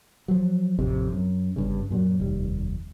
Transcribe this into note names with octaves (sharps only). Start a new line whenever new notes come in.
F3 F#3
A1 F2 C3
F#2
G1 G2 C#3
F#2 A#2 C#3 F#3
F1 D#2 G3